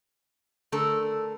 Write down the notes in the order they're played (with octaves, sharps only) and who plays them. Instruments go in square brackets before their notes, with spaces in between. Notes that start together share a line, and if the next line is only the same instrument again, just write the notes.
[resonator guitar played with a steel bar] D3 A3 A4 A#4